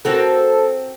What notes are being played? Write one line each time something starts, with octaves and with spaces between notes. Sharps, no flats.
C4 F#4 A4 A#4